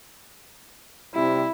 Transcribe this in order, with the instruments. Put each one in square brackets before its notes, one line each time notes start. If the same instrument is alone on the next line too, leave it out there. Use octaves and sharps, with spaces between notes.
[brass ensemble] C3 G3 [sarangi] E4